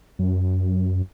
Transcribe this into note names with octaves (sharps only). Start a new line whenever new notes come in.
F#2